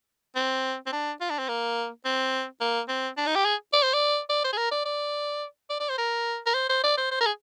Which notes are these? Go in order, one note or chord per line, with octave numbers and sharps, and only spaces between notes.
C4
C4
D4
F4
D4
C4
A#3
C4
A#3
C4
D4
D#4
G4
G#4
D5
C5
D5
D5
C5
G#4
A#4
D5
D5
D5
D5
C5
A#4
A#4
C5
C5
D5
C5
C5
A#4
G#4